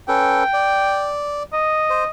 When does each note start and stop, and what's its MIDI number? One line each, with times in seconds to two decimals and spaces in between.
0.08 0.43 61
0.08 0.43 69
0.08 0.43 71
0.08 1.11 79
0.53 1.43 74
1.53 2.10 75
1.90 2.04 72